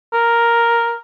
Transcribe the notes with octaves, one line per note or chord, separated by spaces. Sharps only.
A#4